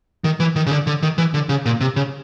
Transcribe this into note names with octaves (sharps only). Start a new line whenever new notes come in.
D#3
E3
D#3
C#3
D3
D3
D#3
E3
D3
C#3
A#2
C3
C#3